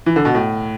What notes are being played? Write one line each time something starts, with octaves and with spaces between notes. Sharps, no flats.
E3
D3
B2
A2